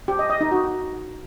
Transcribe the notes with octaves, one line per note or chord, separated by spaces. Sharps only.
G4
D#5
D#5
D#4
F#4